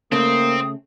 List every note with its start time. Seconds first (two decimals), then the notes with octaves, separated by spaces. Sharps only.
0.12 C#3 A3 A#3 C4 D#6